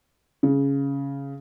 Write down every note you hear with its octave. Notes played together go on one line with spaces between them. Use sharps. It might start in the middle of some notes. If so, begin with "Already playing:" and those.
C#3